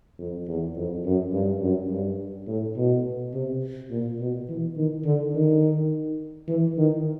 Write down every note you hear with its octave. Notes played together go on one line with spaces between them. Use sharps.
F2
E2
F2
F#2
G2
F#2
G2
A2
B2
C3
A#2
B2
E3
D#3
D3
D#3
E3
D#3